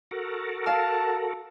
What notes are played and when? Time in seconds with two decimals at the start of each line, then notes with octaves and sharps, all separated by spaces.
0.11 F#4 A4 A#4
0.66 F5 A5 E6 F6